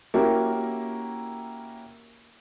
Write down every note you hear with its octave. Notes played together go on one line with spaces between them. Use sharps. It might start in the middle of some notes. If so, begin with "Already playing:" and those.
A#3 C#4 E4 F#4 G4 A#4